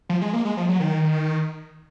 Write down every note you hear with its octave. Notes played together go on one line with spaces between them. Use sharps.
F3
G#3
A#3
G#3
F3
F#3
D#3